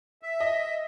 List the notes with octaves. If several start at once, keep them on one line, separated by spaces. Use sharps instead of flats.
E5
D#5